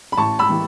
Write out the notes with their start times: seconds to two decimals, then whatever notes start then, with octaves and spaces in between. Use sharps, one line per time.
0.12 B5
0.17 A1 A5 C#6
0.39 B5 E6
0.50 E3